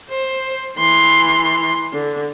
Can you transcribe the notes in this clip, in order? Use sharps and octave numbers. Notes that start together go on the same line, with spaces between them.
C5
E3 C6
D3